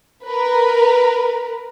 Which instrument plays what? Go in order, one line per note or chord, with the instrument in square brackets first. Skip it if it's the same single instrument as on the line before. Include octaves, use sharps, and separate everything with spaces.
[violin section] A#4 B4